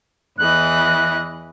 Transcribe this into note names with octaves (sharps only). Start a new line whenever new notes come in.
E2 E3 D#5 F#6